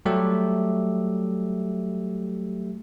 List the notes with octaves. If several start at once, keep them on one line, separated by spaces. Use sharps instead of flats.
F#3 G3 A3 G4 E5